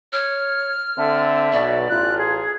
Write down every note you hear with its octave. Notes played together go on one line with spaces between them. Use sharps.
C#5 F6
D3 C4 A4 E5
B1 B2 D5
A1 F4 F#6
G#4